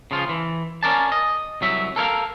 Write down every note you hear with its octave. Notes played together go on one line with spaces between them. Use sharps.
C#3 F3 F4
E3
C#4 A#4 D5 A5
D#5
C2 F#3 E5
A4 A#4 C#5 F5